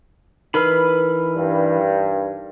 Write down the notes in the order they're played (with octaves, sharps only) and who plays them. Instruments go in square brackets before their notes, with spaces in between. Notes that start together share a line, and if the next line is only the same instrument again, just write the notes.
[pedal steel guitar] E3 B4 B5 [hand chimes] D#4 A#4 F6
[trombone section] G2